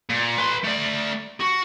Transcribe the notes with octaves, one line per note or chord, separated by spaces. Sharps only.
A#2
B4 C6
A3 D5
F#4